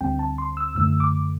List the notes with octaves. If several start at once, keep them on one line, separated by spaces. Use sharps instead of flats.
D2 D3 G3 C4 G5
A5
C6
E6
F#2 D3 A3 E6
D6